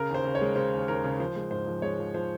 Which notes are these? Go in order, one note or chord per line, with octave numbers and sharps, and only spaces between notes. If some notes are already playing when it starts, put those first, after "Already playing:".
Already playing: C#3 A#4
D#2 C5
C#3
C#5
G#3
C#3 C5
D#2
D#2 A#4
C#3
F3 C5
G#3
G#2 C5
F3
G#3 C#5
F3
F3 C5